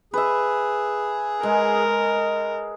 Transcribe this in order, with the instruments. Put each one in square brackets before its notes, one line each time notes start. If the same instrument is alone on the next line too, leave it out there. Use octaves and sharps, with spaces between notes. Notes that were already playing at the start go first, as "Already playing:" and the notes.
[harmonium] G#4 [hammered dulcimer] B4 E5
[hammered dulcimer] G#3 [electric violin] A#4